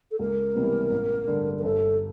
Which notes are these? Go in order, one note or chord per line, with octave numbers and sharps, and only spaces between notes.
A4
C#2 A#4
C3 E3 G3 B3
A1
G2 D3
A#4
G1 A4